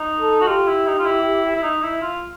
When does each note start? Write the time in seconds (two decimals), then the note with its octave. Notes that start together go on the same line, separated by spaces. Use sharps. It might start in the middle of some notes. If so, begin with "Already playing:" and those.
Already playing: D#4
0.19 A4
0.41 F#4
0.47 F4 G4
0.67 E4
0.87 D#4
0.99 F4
1.05 E4
1.56 E4
1.63 D#4
1.82 E4
2.02 F4